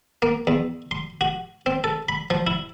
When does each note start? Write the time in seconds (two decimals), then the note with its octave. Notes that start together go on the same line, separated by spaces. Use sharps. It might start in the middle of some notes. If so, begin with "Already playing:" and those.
0.22 A#3
0.47 E2
0.91 C6
1.21 F#4
1.66 C4
1.84 A4
2.09 B5
2.30 F3
2.47 E4